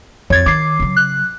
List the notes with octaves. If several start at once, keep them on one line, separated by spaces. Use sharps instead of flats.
F2 C#5 G#6 A6
D#3 D6 C7
C#3 F#3
F#6